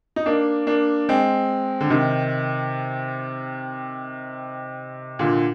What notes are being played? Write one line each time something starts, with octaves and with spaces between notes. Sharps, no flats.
D#4
A#3 D4
A#3 D4
G#3 C4
D3
C3 D#3
A#2 D3